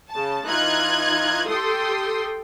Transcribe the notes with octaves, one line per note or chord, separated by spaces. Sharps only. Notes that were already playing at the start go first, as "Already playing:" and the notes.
C#3 A5
E3 D#4 F4 F#6 G#6
G4 A4 G5 C6 D#6